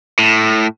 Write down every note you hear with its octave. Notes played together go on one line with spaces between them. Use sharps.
A2